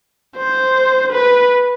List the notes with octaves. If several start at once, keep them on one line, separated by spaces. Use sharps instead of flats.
C5
B4